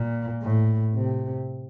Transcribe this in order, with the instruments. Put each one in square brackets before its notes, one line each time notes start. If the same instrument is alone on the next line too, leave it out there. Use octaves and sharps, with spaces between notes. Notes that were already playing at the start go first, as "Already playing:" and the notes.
Already playing: [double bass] A#2
A2
C3